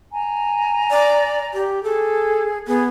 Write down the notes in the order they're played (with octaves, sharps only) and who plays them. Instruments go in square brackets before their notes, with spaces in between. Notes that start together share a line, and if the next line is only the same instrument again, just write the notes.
[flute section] G#5 A#5
[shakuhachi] D5
G4
[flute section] G#4 [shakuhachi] A4
[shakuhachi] B3 [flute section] G#4